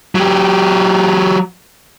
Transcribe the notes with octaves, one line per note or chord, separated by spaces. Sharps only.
F#3 G4